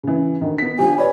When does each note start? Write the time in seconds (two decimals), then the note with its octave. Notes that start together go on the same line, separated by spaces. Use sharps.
0.03 C#3 E3
0.41 D2 D#3
0.58 B3 B6
0.79 D3 F3 G4 G#5
0.98 B4 C#5 D5 B5